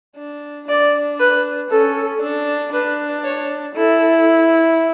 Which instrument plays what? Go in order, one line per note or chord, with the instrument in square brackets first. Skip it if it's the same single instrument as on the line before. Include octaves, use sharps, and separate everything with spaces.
[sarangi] D4
[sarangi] D4 [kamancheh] D5
[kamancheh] B4
[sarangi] C#4 [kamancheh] A4
[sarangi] D4
[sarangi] D4 [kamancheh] B4
[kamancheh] C#5
[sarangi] E4 [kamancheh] A4